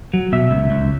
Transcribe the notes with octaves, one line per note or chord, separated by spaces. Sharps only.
F#3
B2 E5
C#2
C#2